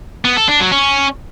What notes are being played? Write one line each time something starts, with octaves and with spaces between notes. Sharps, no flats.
B3
A4
D4
F#3
C#4